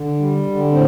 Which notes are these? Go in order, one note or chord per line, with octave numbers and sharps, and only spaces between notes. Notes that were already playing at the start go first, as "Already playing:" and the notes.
Already playing: D3
G3
D3
A2 C4